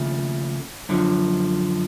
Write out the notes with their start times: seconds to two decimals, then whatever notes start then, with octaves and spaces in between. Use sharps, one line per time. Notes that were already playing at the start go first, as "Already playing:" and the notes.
Already playing: D#2 C#3 F3 A3
0.89 F#2 D3 F3